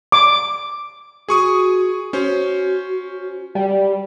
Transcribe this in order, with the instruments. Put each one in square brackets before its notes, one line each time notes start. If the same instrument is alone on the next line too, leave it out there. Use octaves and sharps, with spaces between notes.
[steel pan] D6
[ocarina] F#4 [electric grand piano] G#4 C#6 D#6
[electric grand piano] C#4 C5 [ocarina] F#4
[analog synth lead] G3